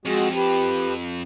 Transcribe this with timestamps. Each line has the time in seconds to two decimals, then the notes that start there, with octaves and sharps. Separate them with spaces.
0.06 F2 G#3 F#4 G#4
0.34 G4 B4